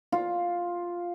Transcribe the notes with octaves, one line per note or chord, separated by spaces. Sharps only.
F4